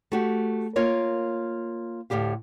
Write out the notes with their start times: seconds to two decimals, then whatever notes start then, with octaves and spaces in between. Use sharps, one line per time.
0.12 A3 F#4 G4
0.76 A#3 F4 A#4 C#5 D#5
2.10 D2 A2 C3 G4 F5